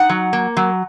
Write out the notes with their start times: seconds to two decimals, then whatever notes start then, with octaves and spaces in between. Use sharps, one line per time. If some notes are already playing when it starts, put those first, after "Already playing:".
Already playing: D#4 F#5
0.10 F#3
0.33 A#3
0.57 F#3